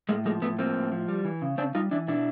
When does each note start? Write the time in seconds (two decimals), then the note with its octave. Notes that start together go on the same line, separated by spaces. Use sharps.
0.09 A2 G#3 A#3
0.25 F3 G#3 A#3
0.42 A2 A3 B3
0.59 F3 A#3 C4
0.76 A2
0.92 F3
1.08 G3
1.25 E3
1.42 C#3
1.58 C#3 C4 D4
1.75 G3 D#4 F4
1.91 E3 D4 E4
2.08 B2 D4 E4